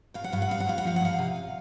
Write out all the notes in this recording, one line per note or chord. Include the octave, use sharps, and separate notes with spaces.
G2 F5
F#5
G2 F5
F#5
G2 F5
F#5
G2 F5
F#5
F3 F5
F#5
E2 F5
C3
C3